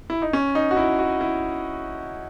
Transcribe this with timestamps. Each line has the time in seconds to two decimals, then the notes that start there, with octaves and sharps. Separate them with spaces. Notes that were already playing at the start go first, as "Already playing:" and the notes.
0.10 E4
0.22 D#4
0.33 C#4
0.55 D#4
0.71 F#4
0.77 E4
0.99 F#4
1.21 E4